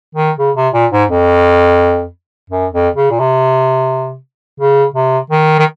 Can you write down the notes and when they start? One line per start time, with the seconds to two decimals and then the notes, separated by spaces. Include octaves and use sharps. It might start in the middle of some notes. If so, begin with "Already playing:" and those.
0.15 D#3
0.39 C#3
0.57 C3
0.74 A#2
0.92 G#2
1.10 F2
2.50 F#2
2.73 F2
2.96 C#3
3.11 A#2
3.20 C3
4.60 C#3
4.94 C3
5.30 D#3
5.59 D#3